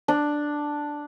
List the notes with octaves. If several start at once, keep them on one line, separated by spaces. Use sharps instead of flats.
D4